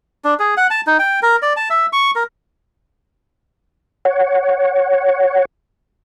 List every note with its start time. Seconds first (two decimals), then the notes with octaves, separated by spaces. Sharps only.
0.25 D4
0.39 G#4
0.57 F#5
0.70 A5
0.87 D#4
0.99 G5
1.22 A#4
1.42 D5
1.56 A5
1.70 E5
1.93 C#6
2.15 A#4
4.05 C#5 F#5